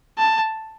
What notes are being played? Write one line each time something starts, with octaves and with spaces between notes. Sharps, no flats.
A5